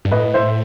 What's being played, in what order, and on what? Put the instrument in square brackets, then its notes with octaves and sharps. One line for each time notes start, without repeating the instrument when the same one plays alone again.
[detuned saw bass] G2
[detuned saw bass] A2 [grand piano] B4 D#5
[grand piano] C5 E5